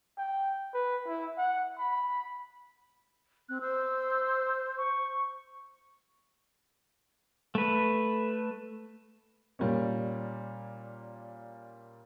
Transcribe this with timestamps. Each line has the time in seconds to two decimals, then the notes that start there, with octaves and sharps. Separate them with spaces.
0.18 G5
0.74 B4
1.07 E4
1.38 F#5
1.78 B5
3.49 C4 F#6
3.61 C5 E6
4.78 C#6
7.55 A3 B4
9.59 A#2 G3 A#3 C#4